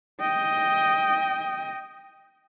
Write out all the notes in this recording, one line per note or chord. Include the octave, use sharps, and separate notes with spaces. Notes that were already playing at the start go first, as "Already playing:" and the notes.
D#5 G5